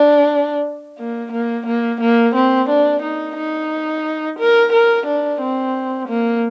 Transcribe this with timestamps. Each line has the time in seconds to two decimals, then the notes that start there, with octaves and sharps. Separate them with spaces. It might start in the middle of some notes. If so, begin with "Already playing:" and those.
Already playing: D4
0.98 A#3
1.32 A#3
1.66 A#3
2.00 A#3
2.35 C4
2.69 D4
3.02 D#4
3.37 D#4
4.39 A#4
4.72 A#4
5.06 D4
5.41 C4
6.08 A#3